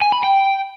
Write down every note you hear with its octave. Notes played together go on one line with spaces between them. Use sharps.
G#5
B5
G5